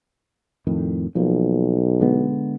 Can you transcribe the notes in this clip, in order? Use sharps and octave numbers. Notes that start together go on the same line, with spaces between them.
F2 A2 D#3
B1 F3 A#3
D3 G#3 B3